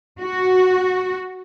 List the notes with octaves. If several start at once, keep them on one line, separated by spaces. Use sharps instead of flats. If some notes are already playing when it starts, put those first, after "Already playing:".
F#4